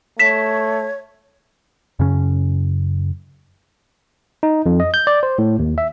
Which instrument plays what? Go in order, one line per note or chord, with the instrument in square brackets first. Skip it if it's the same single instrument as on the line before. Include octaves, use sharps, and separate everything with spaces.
[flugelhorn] A3 [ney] C#5 [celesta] B6 E7
[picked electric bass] F#2 C#3 C#4
[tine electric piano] D#4
F2
D#5
G6
D5
C5
A2
D#2
E5